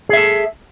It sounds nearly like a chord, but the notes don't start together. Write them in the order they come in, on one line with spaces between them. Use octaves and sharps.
G#4 E5 A4